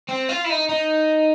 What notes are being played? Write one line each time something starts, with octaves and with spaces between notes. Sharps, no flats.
C4
F4
E4
D#4
D#4